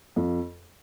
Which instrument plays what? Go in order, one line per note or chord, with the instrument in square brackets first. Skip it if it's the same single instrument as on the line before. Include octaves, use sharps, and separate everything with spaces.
[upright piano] F2